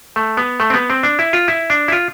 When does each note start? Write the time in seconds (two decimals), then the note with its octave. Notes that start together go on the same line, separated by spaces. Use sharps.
0.16 A3
0.37 B3
0.60 A3
0.70 C4
0.74 B3
0.90 C4
1.03 D4
1.19 E4
1.33 F4
1.48 E4
1.70 D4
1.88 E4
1.92 F4